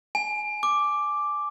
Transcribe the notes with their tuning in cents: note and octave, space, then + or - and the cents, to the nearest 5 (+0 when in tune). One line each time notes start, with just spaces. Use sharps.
G#5 +20
D6 +0